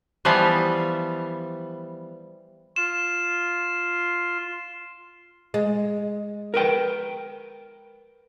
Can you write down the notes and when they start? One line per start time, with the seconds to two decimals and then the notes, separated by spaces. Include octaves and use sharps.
0.25 E3 F3 G3 B3 F5
2.76 F4 C6 E7
5.54 G#3
6.54 A#4 B4 G5